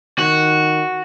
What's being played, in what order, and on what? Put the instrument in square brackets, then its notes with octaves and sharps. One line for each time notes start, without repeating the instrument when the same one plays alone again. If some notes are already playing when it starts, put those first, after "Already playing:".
[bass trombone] D#3 [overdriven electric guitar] F#4